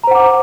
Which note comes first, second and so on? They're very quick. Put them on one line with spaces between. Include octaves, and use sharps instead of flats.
A#5 C5 F#5 D6